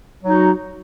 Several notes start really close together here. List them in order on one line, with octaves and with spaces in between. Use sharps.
F#3 D#4 F#4